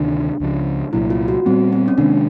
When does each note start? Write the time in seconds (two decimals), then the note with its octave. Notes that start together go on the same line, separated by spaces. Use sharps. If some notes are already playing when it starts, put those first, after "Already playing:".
Already playing: D2 C3 D#3 D4
0.40 C#2 C#3 F3
0.93 C2 A#2 F#3 E4
1.10 F4
1.28 F#4
1.46 A#2 G3 B3 C4
1.73 C4
1.88 C#4
1.98 C3 D#3 G#3 D4